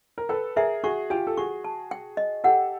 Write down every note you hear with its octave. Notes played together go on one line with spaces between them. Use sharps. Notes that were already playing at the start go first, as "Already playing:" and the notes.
A#4
A4 B4 G5
G#4 A#4 E5
F#4 G#4 C#6
F4 G4 G#5
A4
F#4 G#4 C#6
A5
G5
D#5
G4 A4 F#5